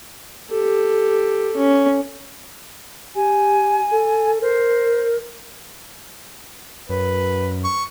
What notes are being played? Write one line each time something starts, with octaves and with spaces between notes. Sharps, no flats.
G4 A4
C#4
G4 G#5
A4
A#4 C5
F#2 B4
C#6